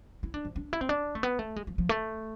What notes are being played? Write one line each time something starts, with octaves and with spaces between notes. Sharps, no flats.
E4
D4
F3
D4
E4
C4
D4
A3
B3
A3
G#3
F3
F3
A3